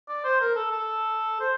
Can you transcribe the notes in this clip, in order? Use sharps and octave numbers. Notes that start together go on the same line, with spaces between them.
D5
C5
A#4
A4
A4
C5